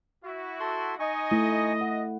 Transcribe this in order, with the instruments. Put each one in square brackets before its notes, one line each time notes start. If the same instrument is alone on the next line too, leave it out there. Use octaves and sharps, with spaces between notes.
[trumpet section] E4 F#4
[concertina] A4 C6
[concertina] D#4 G#5 C#6 [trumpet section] D#5
[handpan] A3 E4
F#5